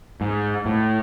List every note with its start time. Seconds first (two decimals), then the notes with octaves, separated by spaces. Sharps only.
0.21 G#2
0.66 A2